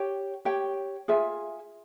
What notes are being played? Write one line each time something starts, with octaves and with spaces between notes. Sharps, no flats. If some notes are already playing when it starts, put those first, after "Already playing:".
Already playing: G4 C#5 G5
G4 C#5 G5
F4 G#4 E5 G#5